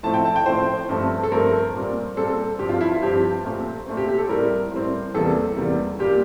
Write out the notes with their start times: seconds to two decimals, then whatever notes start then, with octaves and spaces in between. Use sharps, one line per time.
0.03 A2 F3 A3 C4 A5
0.14 G5
0.25 A5
0.36 G5
0.46 A2 F3 A3 C4 C5
0.89 G2 F3 A3 C4
1.23 A4
1.32 G2 F3 A3 C4 A#4
1.75 A#2 G3 C4
2.17 A#2 G3 C4 A4
2.59 G2 F3 C4 G4
2.69 F4
2.81 E4
2.91 F4
3.02 G2 F3 C4 G4
3.44 A#2 A3 C4
3.86 A#2 A3 C4
3.97 G4
4.09 G4
4.18 A4
4.29 A2 G3 C4 A#4
4.71 A2 G3 C4
5.15 E2 C3 G3 A#3 A4
5.57 E2 C3 G3 A#3
5.99 A#2 G3 A#3 G4